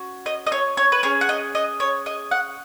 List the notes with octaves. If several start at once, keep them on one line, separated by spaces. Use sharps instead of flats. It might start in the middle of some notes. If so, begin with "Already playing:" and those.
Already playing: C#4 F#4
D#5
D#5
C#5
C#5
B4
C#4 G#4 C#5
F#5
D#5
D#5
C#5
D#5
F#5